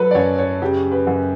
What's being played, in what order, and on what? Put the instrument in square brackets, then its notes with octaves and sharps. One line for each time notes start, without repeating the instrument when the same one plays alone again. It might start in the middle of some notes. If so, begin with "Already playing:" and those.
Already playing: [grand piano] F#3 A4 B4
D5
F#2 C#5
C#5
C#3 G4
B4
F#2